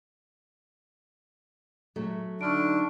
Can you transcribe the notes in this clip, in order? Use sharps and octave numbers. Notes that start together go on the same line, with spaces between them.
F#3 A3
D3 D4 D#4 C#6 F6 D7